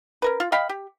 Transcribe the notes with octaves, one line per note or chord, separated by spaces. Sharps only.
C#4 A#4 B4
F4
D#5 F5 G5 B5
G4